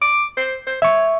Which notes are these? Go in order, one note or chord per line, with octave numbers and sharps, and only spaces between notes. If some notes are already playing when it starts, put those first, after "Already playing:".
D6
C5
C5
C#5 E5 C#6